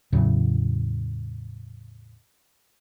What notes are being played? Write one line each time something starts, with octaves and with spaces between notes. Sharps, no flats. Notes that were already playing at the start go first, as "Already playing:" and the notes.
E2 A2 C#3 F#3